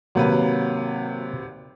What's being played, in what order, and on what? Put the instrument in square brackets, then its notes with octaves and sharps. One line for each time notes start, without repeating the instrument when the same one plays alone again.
[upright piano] G#1 C3 B4 [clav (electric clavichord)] F#3 A#3